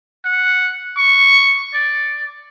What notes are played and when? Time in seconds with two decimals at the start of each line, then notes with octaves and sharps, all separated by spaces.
0.25 F#5
0.97 C#6
1.74 D5